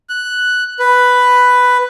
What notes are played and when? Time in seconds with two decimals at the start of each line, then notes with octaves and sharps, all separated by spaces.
0.09 F#6
0.79 B4